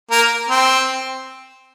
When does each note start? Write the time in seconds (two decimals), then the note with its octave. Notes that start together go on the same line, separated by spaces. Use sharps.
0.11 A#3
0.49 C4